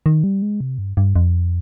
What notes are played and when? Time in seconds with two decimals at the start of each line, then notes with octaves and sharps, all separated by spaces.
0.06 D#3
0.24 G3
0.42 G#3
0.60 C3
0.78 G2
0.97 G2
1.16 F2